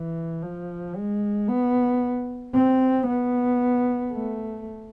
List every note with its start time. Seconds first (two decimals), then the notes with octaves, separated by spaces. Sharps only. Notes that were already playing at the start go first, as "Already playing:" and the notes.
Already playing: E3
0.43 F3
0.96 G#3
1.48 B3
2.54 C4
3.07 B3
4.12 A3